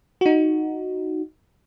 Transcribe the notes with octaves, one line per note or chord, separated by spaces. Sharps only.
D#4 F#4